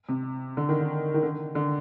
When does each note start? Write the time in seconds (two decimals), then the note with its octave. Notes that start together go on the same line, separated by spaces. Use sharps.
0.09 C3
0.57 D3
0.69 D#3
0.81 D3
1.14 D#3
1.23 D3
1.55 D3